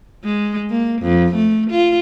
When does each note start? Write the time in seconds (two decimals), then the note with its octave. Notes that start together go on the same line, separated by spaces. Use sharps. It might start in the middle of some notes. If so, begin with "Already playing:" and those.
0.24 G#3
0.70 A#3
1.02 F2
1.35 A3
1.71 F4